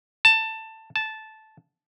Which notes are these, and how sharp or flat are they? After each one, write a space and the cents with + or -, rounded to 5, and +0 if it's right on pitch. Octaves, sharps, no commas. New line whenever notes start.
A5 +15
A5 -10